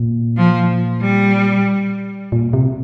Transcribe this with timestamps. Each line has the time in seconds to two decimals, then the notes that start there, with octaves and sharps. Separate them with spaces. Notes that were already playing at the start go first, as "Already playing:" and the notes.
Already playing: A#2
0.37 F3
1.02 G3
2.32 A#2
2.53 C3